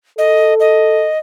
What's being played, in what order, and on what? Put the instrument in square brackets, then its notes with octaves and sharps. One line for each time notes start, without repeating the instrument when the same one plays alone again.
[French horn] A4 [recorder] D#5
[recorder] D#5